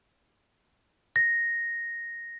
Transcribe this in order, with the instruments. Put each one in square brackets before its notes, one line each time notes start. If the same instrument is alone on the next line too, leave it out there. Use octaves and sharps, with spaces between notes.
[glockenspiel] A#6